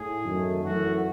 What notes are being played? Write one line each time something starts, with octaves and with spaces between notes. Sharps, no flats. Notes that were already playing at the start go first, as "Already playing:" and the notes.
Already playing: A2 G#4
F#2 D#3 A3
F#2 E3 A3 F#4